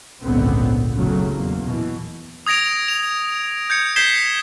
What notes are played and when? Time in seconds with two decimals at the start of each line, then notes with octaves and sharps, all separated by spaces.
0.22 G#1 C#2 A#2 D3 B3 C4
0.93 F#1 B1 A#2 C#3 F#3 A3
1.32 E2 A#3
1.66 B2 E3
2.47 D#6 G#6 A#6 D7 F7
2.88 F7
3.70 G6 G#6 C#7
3.96 G6 G#6 B6 C7 E7 G7